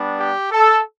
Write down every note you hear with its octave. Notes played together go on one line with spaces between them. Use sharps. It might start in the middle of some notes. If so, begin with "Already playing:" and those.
Already playing: G3 B3 D4
G4
A4